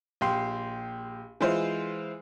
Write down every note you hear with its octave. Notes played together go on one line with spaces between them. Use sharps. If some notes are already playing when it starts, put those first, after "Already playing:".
A#1 G4 C6
E3 G#3 E4 F4 C5